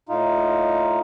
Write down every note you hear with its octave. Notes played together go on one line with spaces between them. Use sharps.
A2 D#4 F4